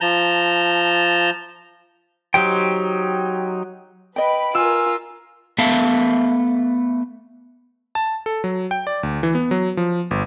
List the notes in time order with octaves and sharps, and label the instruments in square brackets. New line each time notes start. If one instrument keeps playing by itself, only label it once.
[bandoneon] F3 A5 A#5 G6
[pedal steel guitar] F#3 D#4 G4 C5 G5
[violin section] B4 B5 D7 [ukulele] D#5 G5
[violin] F4 A#4 [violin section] G#5 [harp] E6
[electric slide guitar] A3 B3 E5 F5 A5
[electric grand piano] A5
A4
F#3
G5
D5
D2
E3
B3
F#3
F3
G1